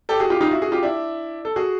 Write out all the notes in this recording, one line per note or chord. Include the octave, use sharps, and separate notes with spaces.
G4 A4
F#4 G#4
F4 G4
D#4 F4
E4 F#4
F#4 G#4
F4 G4
D4 E4
A4
F#4 G#4